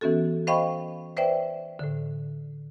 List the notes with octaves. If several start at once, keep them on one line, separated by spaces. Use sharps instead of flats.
E3 B3 C#4 F#4 A4
C5 D#5 F5 G5 B5 C#6
B4 C5 D5 E5 G5
A2 D3